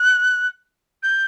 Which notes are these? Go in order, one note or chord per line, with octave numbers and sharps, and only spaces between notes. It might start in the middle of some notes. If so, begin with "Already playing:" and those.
Already playing: F#6
G6